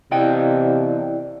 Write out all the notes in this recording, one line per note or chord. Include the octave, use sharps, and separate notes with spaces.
E2 C3 E4 D5 D#5 G5